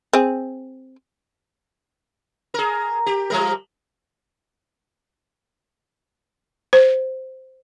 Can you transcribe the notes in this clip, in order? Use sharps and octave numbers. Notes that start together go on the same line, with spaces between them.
C4 G#4
G#4 A#4
G4
F3 G3 A#4
C5